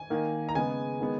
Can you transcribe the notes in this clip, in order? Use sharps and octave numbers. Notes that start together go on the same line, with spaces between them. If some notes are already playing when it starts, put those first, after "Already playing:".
Already playing: G#5
D#3 A#3
A#5
C#3 G#3 B3 G#5
D#3 G#3 B3